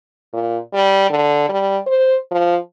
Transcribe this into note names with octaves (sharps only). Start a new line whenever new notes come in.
A#2
G3
D3
G3
C5
F3